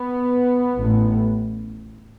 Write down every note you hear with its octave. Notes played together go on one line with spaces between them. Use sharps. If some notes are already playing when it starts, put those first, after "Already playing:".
Already playing: B3
A1 A2